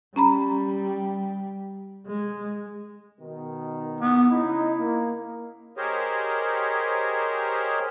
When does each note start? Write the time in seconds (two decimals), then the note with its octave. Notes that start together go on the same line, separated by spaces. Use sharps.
0.16 G3 C#4 A#5 B5
2.07 G#3
3.19 B2 D#3
4.00 B3
4.30 C#3 D#4 E4
4.80 A#3
5.77 G4 G#4 A#4 C5 C#5 D#5